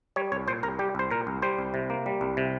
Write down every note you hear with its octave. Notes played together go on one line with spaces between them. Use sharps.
G3 C#5
C2 C#5
A#2 C5
C2 A#4
G3 G4
C2 C5
A#2 A#4
C2
G3 C5
C2
C3
A#3
G3
C2
C3